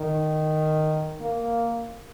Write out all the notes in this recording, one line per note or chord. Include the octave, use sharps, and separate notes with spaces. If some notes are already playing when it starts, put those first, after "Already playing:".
Already playing: D#3
A#3